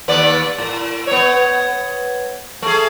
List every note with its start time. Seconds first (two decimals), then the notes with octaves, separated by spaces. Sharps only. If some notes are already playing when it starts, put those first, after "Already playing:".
0.08 D#2 B3 D5
0.58 A2
1.07 B3 C#5
2.62 A3 G#4